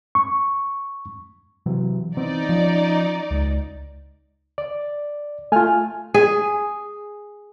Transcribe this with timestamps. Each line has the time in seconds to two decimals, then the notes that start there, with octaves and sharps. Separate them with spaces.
0.15 C#6
1.66 C3 E3 F#3
2.17 E3 B3 C4 D#4 D5
2.49 F3 C#4
3.31 C#2
4.58 D5
5.52 A3 F4 G#5 F6
6.14 G#4